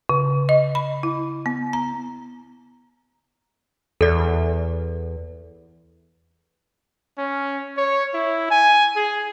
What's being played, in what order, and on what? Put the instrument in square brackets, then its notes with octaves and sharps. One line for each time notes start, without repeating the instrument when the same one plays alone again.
[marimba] C#3
D#5
B5
E4
B3
A#5
[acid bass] E2 [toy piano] A4 D5
[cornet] C#4
C#5
E4
G#5
G#4